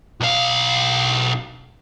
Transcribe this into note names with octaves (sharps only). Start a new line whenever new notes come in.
B1 F5